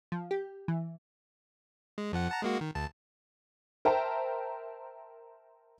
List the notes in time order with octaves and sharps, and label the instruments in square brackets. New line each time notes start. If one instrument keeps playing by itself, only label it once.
[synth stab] F3
G4
E3
[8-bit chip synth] G#3
F2 F3 F#5
F#5 A5 A#5
G#3 A#3 F#4
D#3
D2 A5
[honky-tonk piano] A#4 C5 E5 G5 A5 A#5